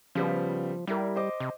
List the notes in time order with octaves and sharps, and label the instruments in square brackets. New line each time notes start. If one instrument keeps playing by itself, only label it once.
[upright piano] C#3 G3 B3 [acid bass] F3
[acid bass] G3 [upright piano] E4 A#4
[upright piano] C5 D#5 D6
[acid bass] C3